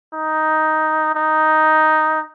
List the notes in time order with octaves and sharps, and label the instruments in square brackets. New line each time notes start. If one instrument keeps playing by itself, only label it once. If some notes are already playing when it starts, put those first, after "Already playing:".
[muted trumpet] D#4
D#4